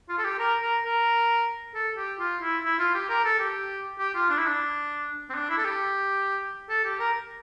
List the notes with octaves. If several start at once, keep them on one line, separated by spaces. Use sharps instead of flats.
F4
A4
G4
A#4
A#4
A#4
A4
G4
F4
E4
E4
F4
G4
A#4
A4
G4
G4
F4
D4
E4
D4
C4
D4
E4
A4
G4
A4
G4
A#4